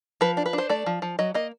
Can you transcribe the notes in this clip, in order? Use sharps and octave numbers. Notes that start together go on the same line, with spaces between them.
F3 B4
D4
B4
D4
C5
A3 D5
F3
F3
F#3 D#5
A#3 D#5